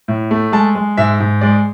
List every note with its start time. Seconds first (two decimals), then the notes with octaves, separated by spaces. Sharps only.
0.08 A2
0.31 A3
0.52 G#3 A5
0.75 G#3
0.97 G#2 E5
1.20 G#2
1.41 G#3 D5